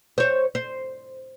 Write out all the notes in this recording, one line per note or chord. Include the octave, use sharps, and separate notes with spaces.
C5 C#5
C5